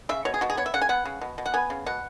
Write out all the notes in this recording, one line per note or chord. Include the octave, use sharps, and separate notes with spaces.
C#3 E5
B2 C#5
G#4
B2 F#4
G#4
B3 C#5
E5
C#3 F#5
G#5
B3 F#5
C#3
B2
B2
F#5
B3 G#5
C#3
B2 F#5